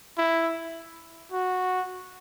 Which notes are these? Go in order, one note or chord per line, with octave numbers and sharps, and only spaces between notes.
E4
F#4